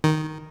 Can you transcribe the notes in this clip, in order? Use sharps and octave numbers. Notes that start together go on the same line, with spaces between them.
D#3